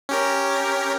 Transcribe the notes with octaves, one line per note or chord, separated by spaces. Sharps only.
C#4 G4 A#4